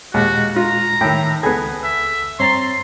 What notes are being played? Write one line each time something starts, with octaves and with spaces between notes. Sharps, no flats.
D#2 A#2 G#3 F#4
F4 A#5
A2 D#3 G5 B5 E6
C#2 B3 G#4 A4 B5 G#6
E5
G2 C4 C#5 A#5 C6 A6